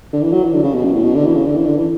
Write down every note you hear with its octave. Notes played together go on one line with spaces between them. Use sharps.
D3
E3
F#3
E3
D3
C#3
B2
F#2
A2
B2
D3
E3
C#3
D3
E3
D3
E3